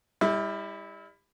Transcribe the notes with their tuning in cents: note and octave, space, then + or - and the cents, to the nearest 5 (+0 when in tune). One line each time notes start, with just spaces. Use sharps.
G3 +25 E4 -25